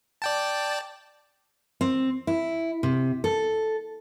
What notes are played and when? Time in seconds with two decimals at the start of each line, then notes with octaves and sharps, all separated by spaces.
0.22 D5 G5 A5
1.81 C4
2.27 E4
2.83 C3
3.24 A4